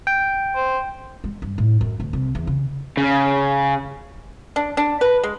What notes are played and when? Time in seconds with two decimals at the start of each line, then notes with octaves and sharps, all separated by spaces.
0.07 G5
0.56 C5
1.24 G#3
1.42 G2
1.58 A2
1.81 F#2
2.00 D2
2.13 C2
2.35 E2
2.47 C#3
2.97 C#3
4.56 D4
4.77 D4
5.01 B4
5.24 G#3